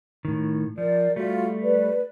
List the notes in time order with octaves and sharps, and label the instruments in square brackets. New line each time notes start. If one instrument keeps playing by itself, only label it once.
[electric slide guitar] A2 D#3
[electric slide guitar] F3 [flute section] A#4 D5
[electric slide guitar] G3 A3 [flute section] F4 F#4
[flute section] B4 D5